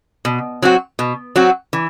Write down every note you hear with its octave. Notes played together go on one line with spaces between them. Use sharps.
B2
F#3 C4 F#4
B2
F#3 C4 F#4
E3